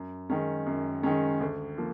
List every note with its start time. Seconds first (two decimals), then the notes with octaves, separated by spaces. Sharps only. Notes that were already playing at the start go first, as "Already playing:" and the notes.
Already playing: F#2
0.30 D#3 G#3 C#4
0.66 F#2
1.03 D#3 G#3 C#4
1.40 D2
1.78 F3 A#3